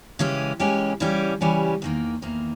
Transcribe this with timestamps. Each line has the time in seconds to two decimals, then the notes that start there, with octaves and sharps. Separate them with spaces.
0.19 C#3 E3 G#3 C#4 G4
0.59 C#3 E3 G#3 C#4 G4
1.00 C#3 E3 G3 C#4 G4
1.41 C#3 E3 G3 C#4 G4
1.82 E2 D#3 A#3
2.22 E2 D#3 A#3